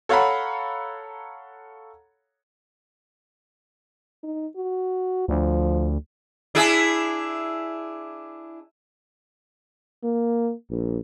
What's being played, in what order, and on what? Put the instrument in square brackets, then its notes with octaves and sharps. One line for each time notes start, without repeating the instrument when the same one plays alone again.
[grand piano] A4 C#5 F5 F#5 A#5 B5
[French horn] D#4
F#4
[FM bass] D2 [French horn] F3
[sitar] D4 E4 G#4
[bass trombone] A#3
A#1